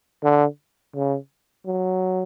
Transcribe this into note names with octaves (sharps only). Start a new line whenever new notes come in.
D3
C#3
F#3